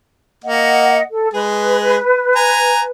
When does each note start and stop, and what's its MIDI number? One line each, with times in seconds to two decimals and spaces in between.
0.44 0.99 58
0.44 1.01 75
0.44 1.01 78
1.11 1.27 69
1.33 1.98 56
1.33 1.98 68
1.33 2.90 71
2.36 2.83 80
2.36 2.83 82